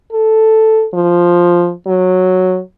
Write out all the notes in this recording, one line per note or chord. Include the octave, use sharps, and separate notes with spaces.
A4
F3
F#3